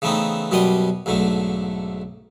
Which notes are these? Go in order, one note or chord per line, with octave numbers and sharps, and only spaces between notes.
C#3 E3 A3 B3 C4 D#4
F#2 B2 G3 D5 C6 D#6
B1 G#2 D3 A3